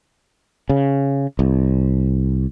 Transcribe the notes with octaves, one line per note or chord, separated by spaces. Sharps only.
C#3
C2